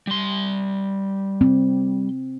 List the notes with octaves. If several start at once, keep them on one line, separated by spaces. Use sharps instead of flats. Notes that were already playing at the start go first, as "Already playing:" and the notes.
G3 C6
C4